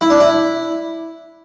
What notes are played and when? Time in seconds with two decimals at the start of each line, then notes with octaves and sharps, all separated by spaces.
0.01 E4
0.10 D4
0.20 E4